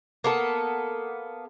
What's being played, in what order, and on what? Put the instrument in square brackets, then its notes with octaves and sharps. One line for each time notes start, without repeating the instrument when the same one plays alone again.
[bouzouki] A#3 B3 A4